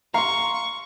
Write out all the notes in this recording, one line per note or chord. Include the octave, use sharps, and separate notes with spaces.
F5 A#5 C6 C#6